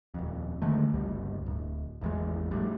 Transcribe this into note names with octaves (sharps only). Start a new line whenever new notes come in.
D#1 F2
D3 D#3 G#3 A3
G1 C#2 G2 G3
D1
G#1 E2 G#3
F2 A2 G3